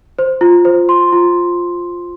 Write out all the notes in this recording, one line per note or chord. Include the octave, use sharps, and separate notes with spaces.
C5
F4
C5
C6
F4